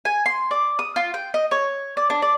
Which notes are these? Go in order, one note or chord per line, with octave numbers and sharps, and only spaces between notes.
G#5
C6
D5
D#6
F4
G5
D#5
C#5
D5
D4
D5